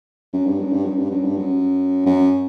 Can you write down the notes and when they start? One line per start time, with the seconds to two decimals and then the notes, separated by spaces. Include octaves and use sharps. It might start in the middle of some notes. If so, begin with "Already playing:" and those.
0.33 F#2
0.47 G2
0.59 F#2
0.72 G2
0.85 F#2
0.99 G2
1.11 F#2
1.24 G2
1.37 F#2
2.06 F#2